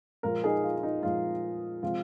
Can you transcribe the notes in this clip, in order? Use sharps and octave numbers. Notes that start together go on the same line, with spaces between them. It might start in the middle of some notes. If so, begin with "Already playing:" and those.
A#2 F3 G#3 F4 A#4
D#4 G#4
F4
F4
D#4
A#2 F3 G#3 F4
C3 F3 G#3 F4